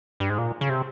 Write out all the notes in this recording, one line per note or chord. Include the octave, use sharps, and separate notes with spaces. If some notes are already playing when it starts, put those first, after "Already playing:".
G2
G#2
A#2
C#3
C3